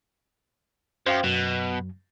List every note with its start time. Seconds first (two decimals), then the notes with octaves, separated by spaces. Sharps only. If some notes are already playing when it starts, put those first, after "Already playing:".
1.07 F#2 C5 F5 G5
1.24 F#2 B2 F#3